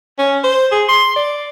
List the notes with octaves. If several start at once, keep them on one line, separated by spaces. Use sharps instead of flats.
C#4
C5
G#4
C6
D5